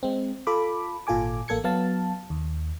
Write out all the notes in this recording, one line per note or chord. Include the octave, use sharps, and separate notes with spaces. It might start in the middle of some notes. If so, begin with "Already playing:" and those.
G#3 C4
F4 A4 B5 D6
G#1 A#2 F4 A4 G#5 D6
A1 A#3 A4 G#6 C#7
F#3 B3 F5 A5
D#2